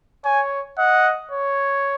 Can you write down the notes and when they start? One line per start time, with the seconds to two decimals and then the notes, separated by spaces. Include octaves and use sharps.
0.25 C#5 G#5
0.78 D#5 F#5
1.32 C#5